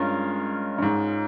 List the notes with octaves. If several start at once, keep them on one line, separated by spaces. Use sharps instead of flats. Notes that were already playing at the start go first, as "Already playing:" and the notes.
Already playing: G2 G#3 C#4 F4 A#4
G2
G#2